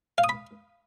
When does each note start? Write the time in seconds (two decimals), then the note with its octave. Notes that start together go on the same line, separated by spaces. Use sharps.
0.18 F5
0.24 D#6
0.29 B5